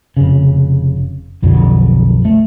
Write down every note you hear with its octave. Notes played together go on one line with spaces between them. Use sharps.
F1 C#3
B1 F2 D3
A3